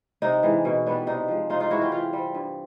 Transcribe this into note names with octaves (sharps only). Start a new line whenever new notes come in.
C3 D#4
E3 G#3
B2
G3 B3 D4
C3 D#4
F3 G#3
C3 D#4 F4
D#4 F4
E3 G#3 E4 F#4
F4 G4
E3 F4 G4
G3 C4
G2